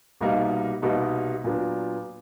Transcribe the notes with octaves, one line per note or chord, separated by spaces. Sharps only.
C2 B2 G3 A#3 D#4
C2 B2 G3 A#3 D#4
A#2 F#3 B3 D4